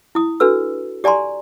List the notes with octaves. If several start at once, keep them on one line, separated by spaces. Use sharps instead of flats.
E4 D#6
D4 F#4 A4 B4 E6
G4 D5 G#5 A#5 C6